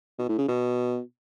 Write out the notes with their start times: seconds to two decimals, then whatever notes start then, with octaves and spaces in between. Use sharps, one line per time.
0.19 B2
0.28 A2
0.38 C#3
0.48 B2